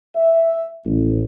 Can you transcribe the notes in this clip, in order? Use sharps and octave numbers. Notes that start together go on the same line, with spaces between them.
E5
A1